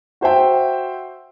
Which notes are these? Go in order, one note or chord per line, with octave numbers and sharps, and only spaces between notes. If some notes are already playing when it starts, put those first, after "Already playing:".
F#4 C5 E5 G5